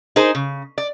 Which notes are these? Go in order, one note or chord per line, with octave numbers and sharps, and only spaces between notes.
D#4 G#4 A#4 C5
C#3
D5